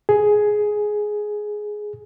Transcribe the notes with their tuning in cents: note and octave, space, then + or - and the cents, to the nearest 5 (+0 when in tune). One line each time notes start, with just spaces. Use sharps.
G#4 +10